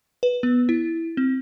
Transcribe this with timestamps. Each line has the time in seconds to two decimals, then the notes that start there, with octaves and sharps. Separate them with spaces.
0.23 B4
0.43 B3
0.69 E4
1.17 C4